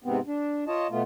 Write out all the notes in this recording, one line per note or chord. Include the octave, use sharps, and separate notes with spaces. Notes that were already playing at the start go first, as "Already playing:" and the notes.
G#2 C3 B3 C4
D4
F4 C#5 D#5 A5
B2 A3 B3 F4